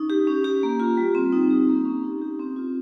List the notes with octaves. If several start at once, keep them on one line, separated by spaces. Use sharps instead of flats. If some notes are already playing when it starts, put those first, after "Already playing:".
Already playing: C#4 D#4
G4
C#4
G4
A#3
F4
G3
C4
D#4
G4
A#3
C#4
D#4
G4
C4
F4